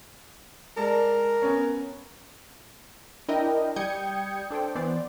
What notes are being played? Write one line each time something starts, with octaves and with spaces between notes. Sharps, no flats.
G#3 A#4 D5 A5
B3 C#4
D4 E4 A#4 D#5 G5
G3 G5 D#6 G6 G#6 C#7
D4 A4 C5 G5
E3 B3 C5 D5